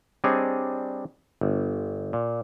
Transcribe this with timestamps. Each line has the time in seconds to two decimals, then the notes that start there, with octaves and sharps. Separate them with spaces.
0.24 G3 C4 D4 G#4 C#5 D#5
1.41 G1
2.13 A#2